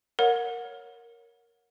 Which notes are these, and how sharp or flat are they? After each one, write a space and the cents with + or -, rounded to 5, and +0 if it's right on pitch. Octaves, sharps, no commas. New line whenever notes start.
A#4 +0 C#5 +0 F#5 -30